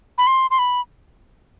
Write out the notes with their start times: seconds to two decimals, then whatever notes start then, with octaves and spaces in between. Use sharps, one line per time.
0.18 B5
0.27 C6
0.50 C6
0.58 B5